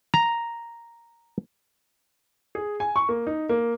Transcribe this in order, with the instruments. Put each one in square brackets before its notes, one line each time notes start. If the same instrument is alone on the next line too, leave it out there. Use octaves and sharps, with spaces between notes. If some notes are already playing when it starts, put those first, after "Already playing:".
[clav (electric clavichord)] A#5
[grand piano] G#4
G#5
C#6
A#3
D#4
A#3